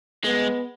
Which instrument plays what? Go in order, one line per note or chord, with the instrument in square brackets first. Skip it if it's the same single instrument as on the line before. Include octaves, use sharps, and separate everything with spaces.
[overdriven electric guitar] G#3 [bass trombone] B3